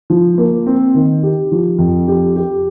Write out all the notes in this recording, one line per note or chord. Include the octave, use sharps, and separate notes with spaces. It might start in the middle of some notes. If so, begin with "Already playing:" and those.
F3
A#3
C4
D#3
G4
F3
F2
G4
G4